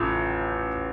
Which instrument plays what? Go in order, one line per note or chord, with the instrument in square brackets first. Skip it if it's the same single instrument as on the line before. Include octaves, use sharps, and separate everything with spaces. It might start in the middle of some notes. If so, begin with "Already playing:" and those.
Already playing: [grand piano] A1 A2 F4